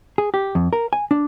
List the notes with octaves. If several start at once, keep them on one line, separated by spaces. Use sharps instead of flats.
G#4
G4
F2
A#4
G#5
D4